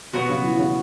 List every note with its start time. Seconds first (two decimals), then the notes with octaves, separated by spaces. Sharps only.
0.13 B2 B3 F#4 C#5
0.29 C#3
0.43 E3
0.58 C#3